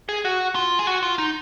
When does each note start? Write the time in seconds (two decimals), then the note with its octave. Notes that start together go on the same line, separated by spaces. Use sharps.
0.09 G#4
0.25 F#4
0.55 F4
0.79 G#4
0.87 F#4
1.03 F4
1.18 D#4